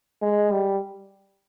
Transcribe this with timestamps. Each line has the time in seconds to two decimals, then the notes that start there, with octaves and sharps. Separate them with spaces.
0.22 G#3
0.52 G3